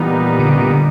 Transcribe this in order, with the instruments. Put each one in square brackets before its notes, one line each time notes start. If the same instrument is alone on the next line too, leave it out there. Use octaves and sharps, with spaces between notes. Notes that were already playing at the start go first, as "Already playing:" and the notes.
Already playing: [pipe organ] A#2 G3 B3 D#4 [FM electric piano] E3
[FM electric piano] D3
C#3
D3